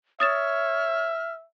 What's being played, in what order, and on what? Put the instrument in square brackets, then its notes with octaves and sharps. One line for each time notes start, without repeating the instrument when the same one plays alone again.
[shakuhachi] C#5 [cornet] E5 [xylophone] D#6 A6 E7 [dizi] F6